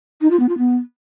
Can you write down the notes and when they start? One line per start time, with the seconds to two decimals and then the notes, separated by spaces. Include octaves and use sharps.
0.21 D#4
0.30 F4
0.39 B3
0.49 F4
0.58 B3